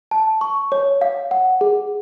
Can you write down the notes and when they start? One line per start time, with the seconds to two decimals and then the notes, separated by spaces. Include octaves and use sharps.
0.11 A5
0.41 C#6
0.72 C#5
1.01 F5
1.31 F#5
1.61 G#4